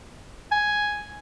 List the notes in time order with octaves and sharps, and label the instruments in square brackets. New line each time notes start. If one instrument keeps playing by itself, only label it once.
[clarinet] G#5